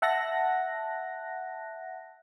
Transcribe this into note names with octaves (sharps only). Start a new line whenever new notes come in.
E5 F#5 A5 F#6 A#6